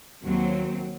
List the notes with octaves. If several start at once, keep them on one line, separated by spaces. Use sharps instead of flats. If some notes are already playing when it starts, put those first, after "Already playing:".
D#2 F#3 C4